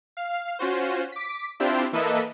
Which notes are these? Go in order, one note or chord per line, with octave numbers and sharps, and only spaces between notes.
F5
C#4 F4 F#4 C5
D6 B6
C4 D4 E4 F4 G4 C5
E3 A#3 A4 B4 D#5 E5